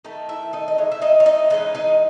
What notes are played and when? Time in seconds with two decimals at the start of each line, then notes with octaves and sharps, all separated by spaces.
0.05 D#3 A3 D#4
0.29 E4 E5
0.53 D#4 D#5
0.68 D#5
0.78 E3 G#3 D#4 C#5
0.92 E5
1.02 D#4 D#5
1.20 C#5
1.26 D#4 D#5
1.50 E3 G#3 C#4 D#4 D#5
1.75 D#4 D#5